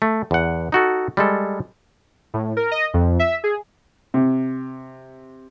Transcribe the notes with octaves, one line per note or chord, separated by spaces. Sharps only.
A3
E2 F#5
D#4 F#4 A4
G3 G#3 A4
A2
A#4
D#5
F2
E5
G#4
C3